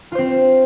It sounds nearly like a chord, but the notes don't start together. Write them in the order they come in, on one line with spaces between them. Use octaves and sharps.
F4 C5 C4